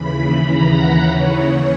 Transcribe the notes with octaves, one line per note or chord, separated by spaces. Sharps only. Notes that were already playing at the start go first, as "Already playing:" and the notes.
Already playing: D#2 C#3 E3 B5
A#5
F#5
D#2 C#3 E3 C#5